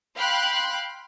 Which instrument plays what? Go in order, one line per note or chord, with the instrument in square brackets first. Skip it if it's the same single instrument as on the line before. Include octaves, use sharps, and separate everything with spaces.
[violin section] F5 G5 B5 C6 F#6